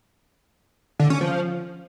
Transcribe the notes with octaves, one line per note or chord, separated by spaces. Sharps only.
D3
C#4
F3